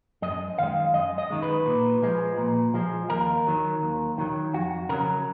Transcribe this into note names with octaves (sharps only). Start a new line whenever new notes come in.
F#2 D#5
D#3 G#3 F5
F#2 D#5
D#5
D#3 G#3
B4
A#2
F3 G#3
A#2
F3 G#3
D#2 A#4
D#3 F#3
D#2
D#3 F#3
F2 F#4
C#3 F#3 A#4